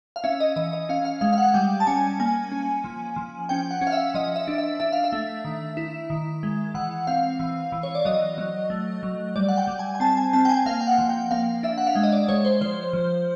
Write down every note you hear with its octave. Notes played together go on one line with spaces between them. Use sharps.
F5
C#4 E5
D#5
E3 D#5
D#5
C#4 F5
F5
G#3 F5
F5
F#5
G3 G5
A5
C#4 G#5
A#3 G#5
C#4
F3
F3
C#4 G5
F#5
C#4
F5
E5
F3 D#5
E5
D4
E5
D4 E5
F5
E5
A3
D#3
E4
D#3
G#3
E3 F#5
C4 F5
E3
E3
C#5
D5
F#3 D#5
F#3
A3
F#3
G3 D5
F#5
G5
G3
G#5
G#5
C4 A5
G#5
C4 A5
G5
G#5
A#3 F5
G5
F#5
F3
G5
A#3 F5
D4 E5
F#5
F5
G#3 E5
D#5
D5
G#3 C#5
C5
F3 C5
F3